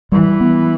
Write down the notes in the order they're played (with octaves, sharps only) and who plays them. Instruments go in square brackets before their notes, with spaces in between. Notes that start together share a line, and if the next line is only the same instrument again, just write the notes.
[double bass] E3 [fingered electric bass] G3
[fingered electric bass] B3